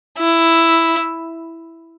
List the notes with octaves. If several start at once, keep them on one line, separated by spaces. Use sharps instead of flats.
E4